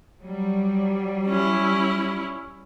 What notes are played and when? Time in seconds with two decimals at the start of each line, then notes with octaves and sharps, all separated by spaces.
0.21 F#3 G3
1.28 C#4 E4